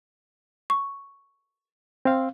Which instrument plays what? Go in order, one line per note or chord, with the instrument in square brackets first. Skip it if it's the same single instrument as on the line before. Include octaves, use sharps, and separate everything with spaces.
[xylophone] C#6
[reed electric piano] C4 F5